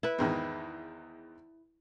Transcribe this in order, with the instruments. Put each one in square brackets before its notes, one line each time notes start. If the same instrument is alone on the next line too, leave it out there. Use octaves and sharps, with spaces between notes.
[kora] E4 B4
[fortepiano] E2 G#2 D#3